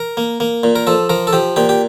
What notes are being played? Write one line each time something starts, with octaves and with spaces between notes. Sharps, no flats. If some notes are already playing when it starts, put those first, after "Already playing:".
Already playing: A#4
A#3
A#3
A#2
A#4
F3 A4
F3 A#4
A4
F3 G4
A#2 G4
G4